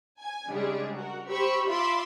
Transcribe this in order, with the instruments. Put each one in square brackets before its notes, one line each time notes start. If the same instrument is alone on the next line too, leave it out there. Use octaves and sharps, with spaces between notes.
[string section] G#5
C#3 G3 G#3 D4 D#4 G#4
F#4 A#4
G4 C5 B5 C#6 E6
F4 E5 B5 C6 D6